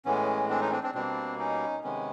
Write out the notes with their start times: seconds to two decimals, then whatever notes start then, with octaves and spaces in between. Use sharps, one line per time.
0.05 A2 E3 G#3 B3 C#4
0.50 C4 D4
0.61 C#4 D#4
0.72 C4 D4
0.83 C4 D4
0.94 B2 G3 A#3 C4 D4
1.39 C#4 D#4
1.83 C3 D#3 G#3 B3 C#4